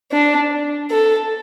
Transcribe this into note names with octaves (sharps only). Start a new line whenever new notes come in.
D4
A4